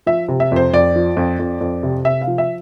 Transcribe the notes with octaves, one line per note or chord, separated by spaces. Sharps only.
F3 E5
C3
E5
F2 C5
F2 D5
F3
F2
F2
F2
C3
C3 E5
F5
F3
E5